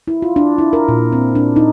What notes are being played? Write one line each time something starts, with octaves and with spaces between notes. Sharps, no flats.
E4
F4
D4
E4
A#4
A#2
C4
D4
D#4